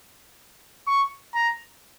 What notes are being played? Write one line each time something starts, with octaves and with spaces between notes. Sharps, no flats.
C#6
A#5